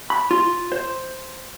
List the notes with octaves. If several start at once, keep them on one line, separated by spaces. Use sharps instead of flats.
B5
F4
C5